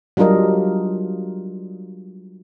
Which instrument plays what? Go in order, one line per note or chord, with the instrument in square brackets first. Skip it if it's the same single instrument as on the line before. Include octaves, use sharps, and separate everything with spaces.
[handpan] F#3 G3 D4 F4 A#4 D#5